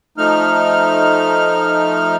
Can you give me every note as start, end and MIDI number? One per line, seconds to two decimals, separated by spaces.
0.18 2.16 53
0.18 2.16 57
0.18 2.16 63
0.18 2.16 89